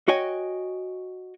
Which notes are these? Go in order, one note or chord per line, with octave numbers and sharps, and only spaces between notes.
F#4 C#5 D#5 G5 G#5